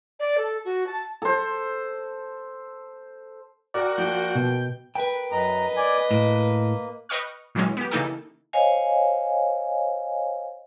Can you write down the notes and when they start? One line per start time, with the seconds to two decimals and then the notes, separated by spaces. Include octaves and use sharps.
0.20 D5
0.38 A4
0.65 F#4
0.87 A5
1.22 A4 C5
3.74 F#4 A#4 D5 G5
3.98 F3 A#3 G5
4.35 B2
4.95 A#4 B4 G5
5.32 F#2 B4 D#5 A#5
5.76 D5 G#5
6.11 A2 A#3
7.09 B4 D#5 G5 C#6 F6
7.55 A#2 D#3 E3 F#3 G#3 C#4
7.77 B3 G4
7.91 C#3 E3 A#3 D#4 G4 A4
8.53 C5 C#5 D#5 F5 G#5